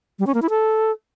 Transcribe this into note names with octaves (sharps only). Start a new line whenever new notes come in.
G3
C#4
A#3
E4
A4